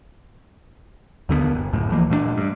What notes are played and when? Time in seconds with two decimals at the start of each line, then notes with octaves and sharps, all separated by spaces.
1.29 D#2 D3 G3 B3
1.55 G1
1.73 C#2 F#2 A2
1.92 E3 F3 A#3
2.10 A#2 A3 B3 D4
2.37 G2